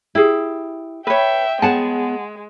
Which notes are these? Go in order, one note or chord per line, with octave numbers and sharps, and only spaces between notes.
E4 G4 G#4
B4 C#5 E5 G5
G#3 B3 G#4 C#5 F#5 A5